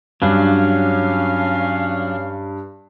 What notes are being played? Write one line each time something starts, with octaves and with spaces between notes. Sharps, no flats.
G2 F#3 C#4 D4 F5